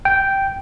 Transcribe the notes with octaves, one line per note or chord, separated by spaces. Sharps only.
G5